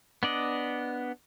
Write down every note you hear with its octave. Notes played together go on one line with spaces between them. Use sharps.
B3 D4 D5 D#5